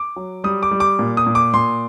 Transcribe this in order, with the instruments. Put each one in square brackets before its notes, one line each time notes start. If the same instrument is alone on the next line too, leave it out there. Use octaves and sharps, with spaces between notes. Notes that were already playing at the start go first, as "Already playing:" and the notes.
Already playing: [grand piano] D6
F#3
G3 D#6
D6
G3
D6
A#2
D#6
A#2
D6
A#2 C6